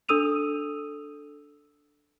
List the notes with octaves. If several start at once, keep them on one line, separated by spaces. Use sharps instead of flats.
D4 A4 D#6 E6 D#7 F7